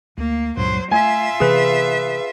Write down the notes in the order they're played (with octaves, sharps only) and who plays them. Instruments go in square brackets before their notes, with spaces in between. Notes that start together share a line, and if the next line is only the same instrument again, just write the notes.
[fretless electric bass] D2 [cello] A#3
[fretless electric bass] C#2 G2 A#2 [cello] F#3 C5
[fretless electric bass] A3 [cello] F4 E5 [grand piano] G#5
[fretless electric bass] C3 E3 B3 [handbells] G#4 B4